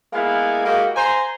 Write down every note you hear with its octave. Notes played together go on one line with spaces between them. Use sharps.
G#3 A#3 B3 E4 F5 G#5
G#3 A#3 E4 F#4 G4
C5 G#5 A#5 C6